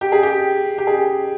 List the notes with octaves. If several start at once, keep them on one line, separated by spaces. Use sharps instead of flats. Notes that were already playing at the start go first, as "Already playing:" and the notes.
G4
G#4
G4
G4
G#4